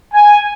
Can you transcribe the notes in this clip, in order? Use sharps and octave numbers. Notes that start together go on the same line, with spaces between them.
G#5